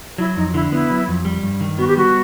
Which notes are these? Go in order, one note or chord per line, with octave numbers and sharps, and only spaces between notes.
F#3 E4
F2 D#4
D3 E4
B3 E4
F#3
F2
G3
G2
D#3
B3 F#4
G4
G3 F#4